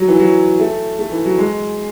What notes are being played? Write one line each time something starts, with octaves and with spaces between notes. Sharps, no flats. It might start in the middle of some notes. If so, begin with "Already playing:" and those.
Already playing: F#3
E3
F#3
A3
A3
E3
F#3
G#3